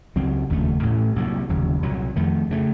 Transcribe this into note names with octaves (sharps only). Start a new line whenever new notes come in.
C#2 C#3 F#3 C4
F1 D#2 C#3 A3
A1 A2 A3 C#4
C2 C3 F#3 A#3
F1 D#2 C#3 F#3
C2 A#2 F#3
F2 D#3 A3
C#3 F#3 A3